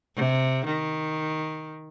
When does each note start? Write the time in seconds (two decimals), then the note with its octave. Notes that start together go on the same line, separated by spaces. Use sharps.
0.16 C3
0.66 D#3